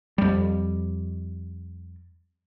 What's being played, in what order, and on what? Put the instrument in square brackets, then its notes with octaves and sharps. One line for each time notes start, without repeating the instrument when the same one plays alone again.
[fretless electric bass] F2 G3